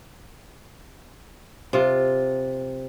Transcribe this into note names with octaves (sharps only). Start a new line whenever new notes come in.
C3 F4